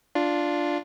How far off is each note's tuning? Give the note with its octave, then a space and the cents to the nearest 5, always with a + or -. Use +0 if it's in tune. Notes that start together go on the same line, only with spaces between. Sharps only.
D4 +0 F4 +0